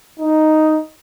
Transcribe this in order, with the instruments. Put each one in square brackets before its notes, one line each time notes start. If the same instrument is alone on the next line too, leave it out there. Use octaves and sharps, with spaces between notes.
[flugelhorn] D#4